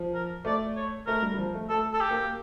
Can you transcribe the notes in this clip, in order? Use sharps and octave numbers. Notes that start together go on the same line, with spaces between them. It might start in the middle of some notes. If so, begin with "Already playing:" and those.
Already playing: F3
A#4
A3 D5
C#5
A3 A#4
G3
G3
F3
A3
A3 A4
A4
G4
A#3